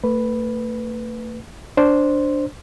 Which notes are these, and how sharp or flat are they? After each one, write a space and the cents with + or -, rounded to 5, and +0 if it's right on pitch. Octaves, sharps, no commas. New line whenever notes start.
A3 +35 B4 +0
D4 +0 C5 +0